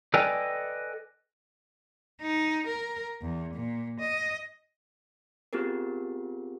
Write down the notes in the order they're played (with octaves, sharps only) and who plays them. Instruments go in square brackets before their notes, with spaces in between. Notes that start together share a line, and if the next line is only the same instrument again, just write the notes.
[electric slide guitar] A4 B4 D5 D#5 G5 G#5
[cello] D#4
A#4
E2
A#2
D#5
[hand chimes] B3 C4 F4 G4 G#4 A#4